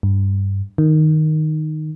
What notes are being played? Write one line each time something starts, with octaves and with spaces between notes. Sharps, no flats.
G2
D#3